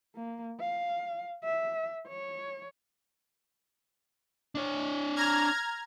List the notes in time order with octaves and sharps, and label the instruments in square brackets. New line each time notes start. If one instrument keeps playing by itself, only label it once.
[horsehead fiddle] A#3
F5
E5
C#5
[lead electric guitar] D4 C#5
[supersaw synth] A#5 F6 G#6